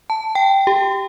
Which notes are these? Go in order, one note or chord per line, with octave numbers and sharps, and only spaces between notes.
A5
G5
G4